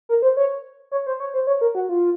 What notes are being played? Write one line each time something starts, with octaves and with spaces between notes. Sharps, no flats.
A#4
C5
C#5
C#5
C5
C#5
C5
C#5
A#4
F#4
F4